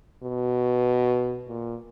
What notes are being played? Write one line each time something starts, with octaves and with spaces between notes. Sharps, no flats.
B2
A#2